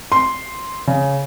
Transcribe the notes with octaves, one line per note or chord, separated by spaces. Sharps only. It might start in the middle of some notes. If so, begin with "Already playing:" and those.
C6
C#3